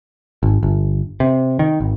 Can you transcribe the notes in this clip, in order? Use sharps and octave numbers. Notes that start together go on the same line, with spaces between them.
G#1
G1
C3
D#3
G#1